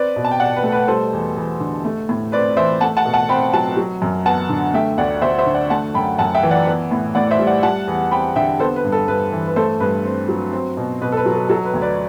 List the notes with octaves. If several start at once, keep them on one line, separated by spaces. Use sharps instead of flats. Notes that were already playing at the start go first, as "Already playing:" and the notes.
Already playing: C4 B4 D5
B2
A5
G5
B2 D5 F#5
B4
A3
B4
G3 A4 C5
E2
E2
D3
A3
A2
C4 B4 D5
E3 C5 E5
A3 F#5 A5
F#5 A5
B2
F#5 A5
C4 G5 B5
F#3 F#5 A5
F#3
F#2
B3 F#5 A5
D3
A3 E5 G5
D2 D5 F#5
D2 C5 E5
C5 E5
D3
D5 F#5
A3 F#5 A5
F#2 G5 B5
F#2 F#5 A5
E5 G5
E3
D5 F#5
B3
A2
A2 D5 F#5
C5 E5
G3
D5 F#5
G3 F#5 A5
E2
C4 G5 B5
D3 E5 G5
B3 A4 C5
B4
G2
A4
G2 B4
E3
B4
A3 A4 C5
G2 B4
C4
F#3
C4
B2
B2 B4
A4
B4
F#3
A4
F#3 A4
B4
D2
B4 D5